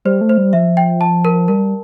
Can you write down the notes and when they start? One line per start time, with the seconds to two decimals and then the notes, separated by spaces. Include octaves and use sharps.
0.05 G3 C5
0.21 A3
0.29 C5
0.38 G3
0.53 F3 E5
0.77 G5
1.01 A5
1.25 A#4
1.48 G3 A#4